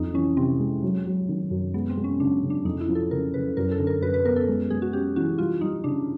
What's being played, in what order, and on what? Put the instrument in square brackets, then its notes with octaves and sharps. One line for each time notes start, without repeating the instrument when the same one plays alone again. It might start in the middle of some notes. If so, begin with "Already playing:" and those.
Already playing: [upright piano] F2 [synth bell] D#4
[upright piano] E3 [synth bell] C#4
[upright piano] C3 [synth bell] C4
[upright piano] G#3
F#3
F#3
D#3
F#2
[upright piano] G#3 [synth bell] B3
[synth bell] C4
[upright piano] G#3
[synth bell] C#4
[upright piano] C#3 [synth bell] D4
[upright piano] C#3
[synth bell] D4
[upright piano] F2 [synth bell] D#4
[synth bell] E4
[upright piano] F3
[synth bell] A4
[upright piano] C#3 [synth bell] A#4
[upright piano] C#3 [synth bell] B4
[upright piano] F#2 [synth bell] A#4
[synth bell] A4
[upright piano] D3
[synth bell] A#4
[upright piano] F#2 [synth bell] B4
[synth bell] B4
[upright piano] B3 [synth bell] A#4
[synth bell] A4
[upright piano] G#3
[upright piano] G#3 [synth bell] G#4
[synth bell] F#4
[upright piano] C#4 [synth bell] G4
[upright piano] E3 [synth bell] F#4
[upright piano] G3 [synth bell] F4
[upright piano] G3 [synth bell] D#4
[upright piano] C#3 [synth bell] D4